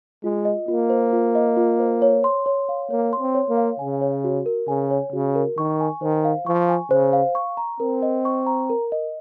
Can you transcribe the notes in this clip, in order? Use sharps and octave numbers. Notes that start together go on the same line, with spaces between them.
G#3 F4
D#5
A#3 F4
C5
F4
D#5
F4
C5
C#5
C6
C#5
F5
A#3 C#5
C6
C4
C#5
A#3
F5
C#3 G#5
C#5
F#4
A#4
C#3 G#5
C#5
C#3 F#4
A#4
D#3 C#6
G#5
D#3 C5
F5
F3 C#6
G#5
C#3 C5
F5
C#6
A#5
C4 A#4
D#5
C#6
A#5
A#4
D#5